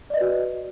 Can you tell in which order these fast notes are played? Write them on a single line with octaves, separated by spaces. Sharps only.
D5 D#5 B4 F#4